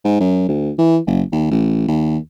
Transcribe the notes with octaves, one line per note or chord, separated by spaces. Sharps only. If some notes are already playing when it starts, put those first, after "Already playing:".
G#2
F#2
D2
E3
F#1
D#2
A1
D#2